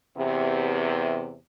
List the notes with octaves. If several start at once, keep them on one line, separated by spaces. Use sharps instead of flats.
E2 C3